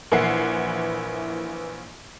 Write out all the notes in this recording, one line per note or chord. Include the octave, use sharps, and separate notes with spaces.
A#1 E3 A#3 E4 F#5 C7